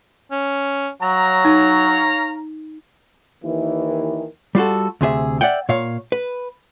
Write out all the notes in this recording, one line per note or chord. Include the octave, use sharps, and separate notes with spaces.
C#4
F#3 C#5 F5 A#5
D#4
D#2 D#3 E3
G3 F4 F#4 A4
D2 C3 G#4 E5
D5 E5 F#5 G5
A#2 C#5 F5
B4